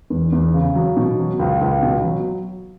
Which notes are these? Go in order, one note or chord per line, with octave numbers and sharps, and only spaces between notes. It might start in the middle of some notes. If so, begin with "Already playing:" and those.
E2
E2
C#3
F#3
B2
F#3
C#2
C#2
B2
F#3